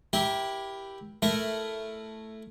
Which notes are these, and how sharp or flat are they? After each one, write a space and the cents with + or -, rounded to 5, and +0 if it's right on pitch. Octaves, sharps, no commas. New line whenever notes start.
E4 +0 G4 +0 A#4 +30
A3 +0 E4 +10 A#4 -5